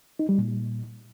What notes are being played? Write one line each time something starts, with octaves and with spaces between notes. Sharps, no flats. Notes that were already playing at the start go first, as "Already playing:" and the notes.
D#4
G3
A#2